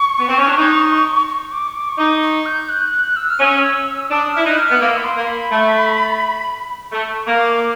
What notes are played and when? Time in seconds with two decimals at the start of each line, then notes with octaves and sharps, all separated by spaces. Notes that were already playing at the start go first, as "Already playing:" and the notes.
Already playing: C#6
0.19 B3
0.28 C4
0.39 C#4
0.48 D4
0.57 D#4
1.28 C#6
1.52 D6
1.68 C#6
1.75 D6
1.89 C#6
1.98 D#4 D6
2.22 C#6
2.46 G6
2.69 F#6
2.93 F#6
3.16 E6
3.30 F6
3.40 C#4 E6
4.10 D4 D#6
4.34 E4 F6
4.45 D#4 F#6
4.57 F6
4.70 B3
4.80 A#3 E6
4.97 B5
5.05 C6
5.16 A#3 C6
5.27 B5
5.51 A3
6.92 A3 C#6
7.27 A#3 D6
7.56 D6